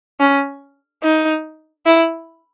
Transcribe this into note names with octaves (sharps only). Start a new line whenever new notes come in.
C#4
D#4
E4